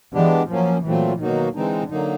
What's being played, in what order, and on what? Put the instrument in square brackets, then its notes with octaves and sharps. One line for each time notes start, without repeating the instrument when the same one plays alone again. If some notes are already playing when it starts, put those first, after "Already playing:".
[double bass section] E3 [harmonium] G#3 B3 D4 G4
[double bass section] F3 [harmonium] F#3 A#3 C#4
[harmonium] A#2 F#3 A3 C4 F4 [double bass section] E3
[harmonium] B2 F#3 A#3 D#4 F#4 [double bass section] D#3
[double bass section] D3 [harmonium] E3 G#3 C4 D#4
[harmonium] D3 F#3 A#3 D#4